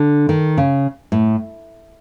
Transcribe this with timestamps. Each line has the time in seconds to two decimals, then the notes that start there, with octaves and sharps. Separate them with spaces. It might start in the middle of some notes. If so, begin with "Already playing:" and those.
Already playing: D3
0.29 D#3
0.58 C#3
1.12 A2